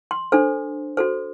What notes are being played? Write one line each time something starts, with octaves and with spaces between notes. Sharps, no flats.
C6
D4 A4 C5
F#4 A4 C5